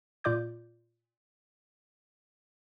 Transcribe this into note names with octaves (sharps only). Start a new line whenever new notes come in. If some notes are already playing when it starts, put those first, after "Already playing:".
A#2 F4 D5 D6 G6